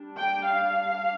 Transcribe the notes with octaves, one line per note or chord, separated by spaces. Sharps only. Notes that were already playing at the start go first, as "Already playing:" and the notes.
Already playing: G3 D4
G5
F5